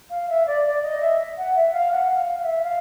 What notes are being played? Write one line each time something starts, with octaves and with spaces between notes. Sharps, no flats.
F5
E5
D5
D5
D#5
E5
F#5
E5
F5
F#5
F5
F5
E5
F5